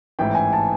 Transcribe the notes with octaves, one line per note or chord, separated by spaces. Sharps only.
A1 G#2 E3 A3 G5
G#5
A5